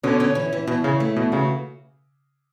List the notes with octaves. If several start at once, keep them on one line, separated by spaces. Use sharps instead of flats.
B2 D3 C#4
C#4
E3
E3
B2 E3
C#3 C#4
A3
B2 E3
C#3 F#4